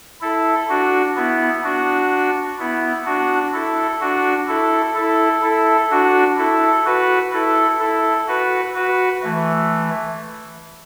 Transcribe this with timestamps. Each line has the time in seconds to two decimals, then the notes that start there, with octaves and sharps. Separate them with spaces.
0.21 E4 A4
0.69 D4 F#4
1.16 B3 E4
1.64 D4 F#4
2.59 B3 E4
3.06 D4 F#4
3.53 E4 A4
4.01 D4 F#4
4.48 E4 A4
4.95 E4 A4
5.43 E4 A4
5.91 D4 F#4
6.38 E4 A4
6.86 F#4 B4
7.33 E4 A4
7.80 E4 A4
8.27 F#4 B4
8.75 F#4 B4
9.23 E3 A3